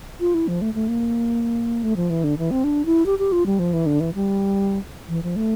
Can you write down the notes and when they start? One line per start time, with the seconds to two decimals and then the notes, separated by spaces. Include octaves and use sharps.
0.20 F4
0.34 E4
0.48 F3
0.61 A3
0.74 A3
0.88 A#3
1.83 A3
1.96 F3
2.10 E3
2.24 D3
2.38 E3
2.51 C4
2.64 D4
2.86 E4
3.06 G4
3.19 G4
3.32 F4
3.46 G3
3.59 F3
3.73 E3
3.86 D3
4.00 E3
4.14 G3
5.09 E3
5.23 F3
5.36 A3